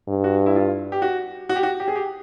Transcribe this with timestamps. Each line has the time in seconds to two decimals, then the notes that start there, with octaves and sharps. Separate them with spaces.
0.08 G2
0.24 F#4
0.46 E4
0.55 F4
0.92 G4
1.02 F#4
1.49 F#4
1.56 G4
1.63 F#4
1.80 G4
1.88 G#4
1.95 G4